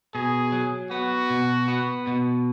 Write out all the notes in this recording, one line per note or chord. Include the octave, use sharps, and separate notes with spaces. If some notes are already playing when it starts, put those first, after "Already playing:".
B2 G#4
F#3
B3 F#4
B2
B3
B2